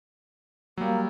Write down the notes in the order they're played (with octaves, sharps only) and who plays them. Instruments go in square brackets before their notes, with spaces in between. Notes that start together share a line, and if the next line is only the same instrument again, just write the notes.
[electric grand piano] F#3 G3 [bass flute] A#3